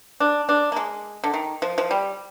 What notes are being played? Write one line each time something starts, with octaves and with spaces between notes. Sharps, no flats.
D4
D4
A#3
G#3
D3
D#3
F3
F3
G3